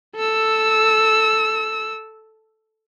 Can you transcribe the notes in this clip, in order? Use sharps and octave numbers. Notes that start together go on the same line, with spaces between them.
A4 E6